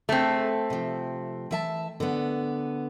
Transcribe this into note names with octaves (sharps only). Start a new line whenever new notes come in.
A3 C4 G#4
C3 F3
E3 E5 A5
D3 B3